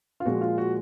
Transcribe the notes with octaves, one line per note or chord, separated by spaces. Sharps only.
F4
A#2 F3 G#3 F#4
F4
F#4